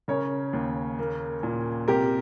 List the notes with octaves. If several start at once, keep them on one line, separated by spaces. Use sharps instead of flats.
C#3 A#4 C#5
D#2
A#3
A#2
C3 G4 A#4